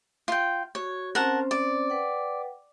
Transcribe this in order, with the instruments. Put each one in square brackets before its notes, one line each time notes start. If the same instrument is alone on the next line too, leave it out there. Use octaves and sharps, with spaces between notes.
[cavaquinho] F4 G5
[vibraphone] F#4 [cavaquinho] C#5
[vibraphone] C4 C#4 C5 [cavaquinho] A#4 F#5 A5
[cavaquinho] D5
[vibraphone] B4 F#5 G5